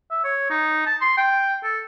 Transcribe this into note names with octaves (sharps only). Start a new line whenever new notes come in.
E5
C#5
D#4
A5
C6
G5
A4